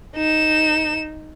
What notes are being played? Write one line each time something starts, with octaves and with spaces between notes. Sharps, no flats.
D#4 E7